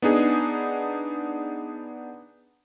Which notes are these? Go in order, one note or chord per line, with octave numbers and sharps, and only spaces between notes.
B3 D4 D#4 G#4